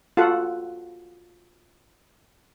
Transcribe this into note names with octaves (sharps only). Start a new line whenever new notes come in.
F4 F#4 A4 F#5